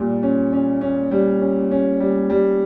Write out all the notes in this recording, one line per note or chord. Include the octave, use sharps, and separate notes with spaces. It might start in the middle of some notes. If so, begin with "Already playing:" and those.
Already playing: A#2 G3
C#4
C#4
C#4
G3
C#4
C#4
G3
G3